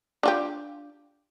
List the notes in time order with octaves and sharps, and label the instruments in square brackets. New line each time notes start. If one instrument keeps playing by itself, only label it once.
[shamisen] D4 F4 G4